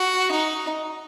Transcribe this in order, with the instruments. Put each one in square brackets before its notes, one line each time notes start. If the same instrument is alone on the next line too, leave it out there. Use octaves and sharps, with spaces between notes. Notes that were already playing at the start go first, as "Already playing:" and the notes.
Already playing: [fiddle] F#4
D#4